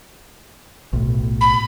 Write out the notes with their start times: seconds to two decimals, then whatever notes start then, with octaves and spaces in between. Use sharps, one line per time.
0.93 B1 A2
1.41 B5